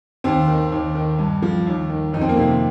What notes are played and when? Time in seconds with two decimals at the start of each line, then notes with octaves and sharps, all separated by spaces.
0.24 D#2 C4
0.48 D#3
0.72 D#2
0.95 D#3
1.18 G2
1.42 F3
1.67 D#2
1.89 D#3
2.13 F2 D#4
2.21 C4
2.29 A#3
2.37 C3 D#3 C4